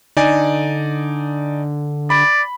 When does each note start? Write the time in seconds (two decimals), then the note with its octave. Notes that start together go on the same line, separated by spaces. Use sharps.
0.17 D3 D#4 D5 G#5
2.10 D5 B5